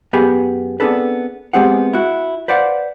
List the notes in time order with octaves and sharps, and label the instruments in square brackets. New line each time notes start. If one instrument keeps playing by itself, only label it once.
[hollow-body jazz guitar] F#2 B3 G4 G#4 G#5 B5
B3 C4 D4 G#4 A4 B4
G#3 B3 C4 G4 G#4 F#5
E4 F#4
B4 C5 D5 F5 F#5